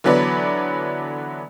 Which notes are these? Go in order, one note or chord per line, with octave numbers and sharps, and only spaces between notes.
D3 E3 F#3 B3 B4 D5